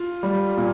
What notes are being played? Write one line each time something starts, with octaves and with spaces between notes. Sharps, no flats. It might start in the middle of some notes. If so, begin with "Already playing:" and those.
Already playing: F4
G3
A#2